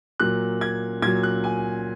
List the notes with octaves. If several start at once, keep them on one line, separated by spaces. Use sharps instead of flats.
A#2 F#3 F#6
G#6
A#2 F#3 G#6
F#6
G#5